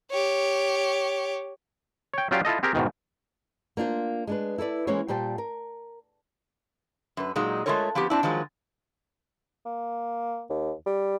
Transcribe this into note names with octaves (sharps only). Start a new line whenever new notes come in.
G4 C#5
C#5 G5
F#3 C#4 F4 G4 D5 F5
E4 F4 A4 D#5
C4 G4 G#4 A#4
E2 G#2 B2 D#3
A#3 D4 F4 C5
G#3 D4 B4
E4 A4 B4 D5
E3 G#3 A#3 C#4 C5 C#5
A#2 G3 C5 G5 A5
A#4
F#2 B4
A#2 F#3 G#3 D#4
G#3 A3 C4 F4 A#4 C#5
F3 B3 C4 G4
C4 D4 E4
D#3 F3 F#3 G#3
A#3
D#2
G3